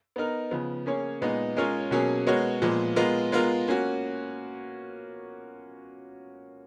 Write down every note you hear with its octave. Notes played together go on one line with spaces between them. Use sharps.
B3 D#4 A#4
C#3 F3 B3
A#3 C#4 G#4 C#5
A#2 G#3 B3 D#4
G#3 C#4 F4 A#4 C#5
B2 F#3 A#3 C#4 G#4
G#3 B3 F#4 A#4 C#5
A#2 F3 G#3 B3
G#3 B3 F4 A#4
G#3 B3 F4 A#4
A#3 C#4 F#4